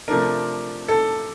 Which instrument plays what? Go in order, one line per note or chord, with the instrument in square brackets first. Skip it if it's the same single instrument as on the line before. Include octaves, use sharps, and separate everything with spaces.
[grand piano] C3 F3 A3 D4 A#4
A4